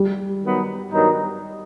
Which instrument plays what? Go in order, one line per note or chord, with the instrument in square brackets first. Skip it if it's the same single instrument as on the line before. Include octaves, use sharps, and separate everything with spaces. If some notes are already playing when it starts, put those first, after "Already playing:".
Already playing: [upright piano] G3
[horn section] D#3 F#3 B3 D#4
G2 D#3 F#3 B3 D#4